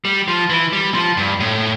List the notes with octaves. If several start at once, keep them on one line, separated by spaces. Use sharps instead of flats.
G3
F3
E3
G3
F3
G2
A2